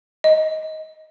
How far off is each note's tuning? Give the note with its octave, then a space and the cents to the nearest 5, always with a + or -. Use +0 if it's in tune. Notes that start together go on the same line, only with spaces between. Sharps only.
D#5 +15